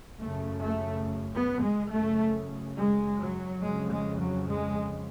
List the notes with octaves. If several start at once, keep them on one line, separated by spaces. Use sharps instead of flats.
F#2 C#3 A3
A3
B3
G#3
F#2 C#3 A3
G#3
F#3
F2 C#3 G#3
G#3
F#3
G#3